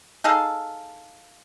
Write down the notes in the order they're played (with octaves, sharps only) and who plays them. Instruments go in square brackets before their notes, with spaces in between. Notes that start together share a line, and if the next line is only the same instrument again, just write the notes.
[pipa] D#4 G#4 A4 F5